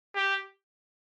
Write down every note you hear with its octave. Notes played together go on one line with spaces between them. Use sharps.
G4